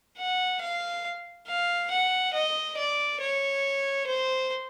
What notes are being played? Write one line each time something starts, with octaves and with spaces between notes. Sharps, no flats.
F#5
F5
F5
F#5
D#5
D5
C#5
C5